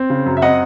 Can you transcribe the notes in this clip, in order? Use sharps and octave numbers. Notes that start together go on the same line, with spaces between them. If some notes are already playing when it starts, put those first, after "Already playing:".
Already playing: C4
C#3
F#2
E5
C4 D#5 F#5